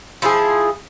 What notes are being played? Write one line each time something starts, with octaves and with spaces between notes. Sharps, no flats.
F3 E4 F4 G#4